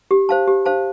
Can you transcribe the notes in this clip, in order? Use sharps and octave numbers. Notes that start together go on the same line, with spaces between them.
G4
C5 F5 A5
G4
C5 F5 A5